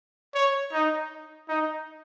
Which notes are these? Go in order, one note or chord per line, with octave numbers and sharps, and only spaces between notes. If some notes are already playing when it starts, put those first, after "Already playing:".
C#5
D#4
D#4